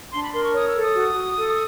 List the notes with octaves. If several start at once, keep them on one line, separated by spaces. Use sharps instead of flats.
D4 C6
B5
A#4 C6
C#6
C#5 D#6
E6
A4
D#6
F#4
F#4
A4